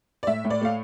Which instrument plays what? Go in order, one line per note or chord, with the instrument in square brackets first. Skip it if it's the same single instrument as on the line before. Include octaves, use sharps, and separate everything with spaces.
[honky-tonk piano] D5
A2 E5
A2
D5
A3 F5